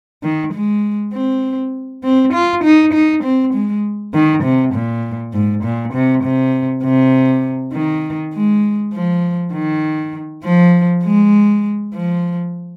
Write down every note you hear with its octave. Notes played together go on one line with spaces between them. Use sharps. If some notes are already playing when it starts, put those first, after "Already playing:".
D#3
G#3
C4
C4
F4
D#4
D#4
C4
G#3
D#3
C3
A#2
G#2
A#2
C3
C3
C3
D#3
G#3
F3
D#3
F3
G#3
F3